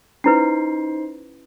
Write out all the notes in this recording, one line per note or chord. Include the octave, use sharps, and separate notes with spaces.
C#4 D#4 E4 B4 C5 C7